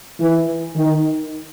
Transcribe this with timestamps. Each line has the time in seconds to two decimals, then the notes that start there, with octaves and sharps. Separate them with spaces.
0.20 E3
0.75 D#3